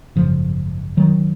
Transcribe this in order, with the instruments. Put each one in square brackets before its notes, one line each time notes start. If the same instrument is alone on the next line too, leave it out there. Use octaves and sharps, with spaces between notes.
[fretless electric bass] G#1 F#2 C#3 F3
D#3 F#3